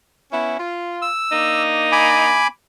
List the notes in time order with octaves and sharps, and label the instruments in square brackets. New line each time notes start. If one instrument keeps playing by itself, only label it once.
[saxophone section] B3 C#4 E4
F4
[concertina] E6
[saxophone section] A#3 D4 D#4
[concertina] G#5 B5 D6